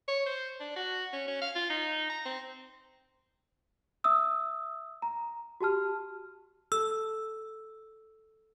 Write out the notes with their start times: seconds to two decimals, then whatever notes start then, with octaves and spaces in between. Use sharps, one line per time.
0.08 C#5
0.26 C5
0.60 D4
0.76 F#4
1.13 C#4
1.28 C#4
1.42 F5
1.55 F4
1.70 D#4
2.10 A#5
2.25 C4
4.04 E5 D#6 E6
5.02 A#5
5.61 F#4 G4 A5 F6
6.72 A4 E6